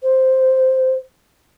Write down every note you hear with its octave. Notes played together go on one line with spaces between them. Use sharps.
C5